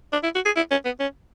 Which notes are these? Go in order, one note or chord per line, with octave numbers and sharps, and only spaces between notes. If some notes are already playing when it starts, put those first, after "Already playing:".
D4
E4
F#4
G#4
E4
C#4
B3
C#4